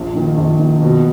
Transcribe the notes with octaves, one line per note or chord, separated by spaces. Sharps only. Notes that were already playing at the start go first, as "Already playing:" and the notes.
Already playing: A#1
D#3
A#1
D#3
B2